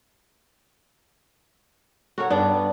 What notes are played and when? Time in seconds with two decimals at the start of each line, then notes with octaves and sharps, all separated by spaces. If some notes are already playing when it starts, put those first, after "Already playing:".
2.18 F#4 A4 A#4 C#5 F#5
2.30 G2 B3 D4 D5